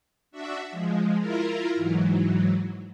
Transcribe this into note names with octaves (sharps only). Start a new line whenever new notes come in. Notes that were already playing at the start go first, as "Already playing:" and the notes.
D4 F#4 E5
F3 G#3
E4 F4 A#4
G#2 E3 F#3